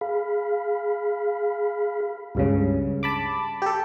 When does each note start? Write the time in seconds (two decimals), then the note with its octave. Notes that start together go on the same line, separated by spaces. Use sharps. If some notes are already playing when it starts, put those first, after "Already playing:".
0.01 G#4 F5 B5
2.35 C#2 G2 C#3
3.03 A5 B5 D6
3.62 G4 A4